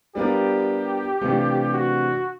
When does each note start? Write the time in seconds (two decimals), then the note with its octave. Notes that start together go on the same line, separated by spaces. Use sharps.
0.15 G3 B3 D4 F4 G4 A#4
1.21 C3 E3 A3 D4 F4
1.73 F#4